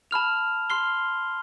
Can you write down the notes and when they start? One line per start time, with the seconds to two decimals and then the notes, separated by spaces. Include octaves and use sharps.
0.11 A5 B5 F6 F7
0.70 C6 F6 C7 G7